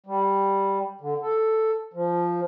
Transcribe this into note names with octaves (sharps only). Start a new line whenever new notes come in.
G3
D3
A4
F3